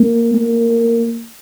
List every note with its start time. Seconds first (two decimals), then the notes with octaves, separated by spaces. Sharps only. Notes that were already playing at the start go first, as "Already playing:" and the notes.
Already playing: A#3
0.35 A#3